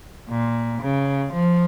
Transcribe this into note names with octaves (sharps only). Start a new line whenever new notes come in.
A#2
C#3
F3